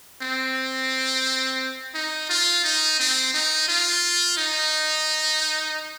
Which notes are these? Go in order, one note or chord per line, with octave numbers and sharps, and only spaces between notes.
C4
D#4
F4
D#4
C4
D#4
F4
D#4